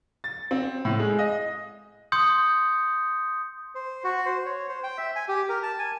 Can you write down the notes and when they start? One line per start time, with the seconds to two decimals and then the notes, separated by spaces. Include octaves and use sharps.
0.24 A6
0.51 C4
0.85 A2
0.99 G#3
1.19 D#5
2.12 C6 D#6 G6 C#7
3.75 C5
4.04 F#4
4.26 C5
4.46 C#5
4.69 C5
4.83 G5
4.98 E5
5.16 G#5
5.28 G4
5.49 A#4
5.63 A5
5.79 G#5